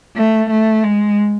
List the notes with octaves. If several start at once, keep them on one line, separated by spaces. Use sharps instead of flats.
A3
A3
G#3